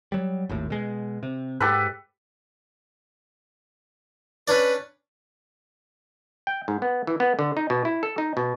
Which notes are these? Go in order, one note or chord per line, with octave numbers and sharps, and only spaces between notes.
F#3 G3
G#1 D#2 A2
B2 G#3
C3
G#2 G4 A4 B4
C#4 D4 B4 D5
G5
G#2
B3
E3
B3
D3
D#4
B2
E4
A4
D#4
B2